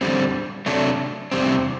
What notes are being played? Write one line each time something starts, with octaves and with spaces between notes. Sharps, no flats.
E2 D3 G3 C4
C3 F#3 A3 D4
E2 C3 G3 C4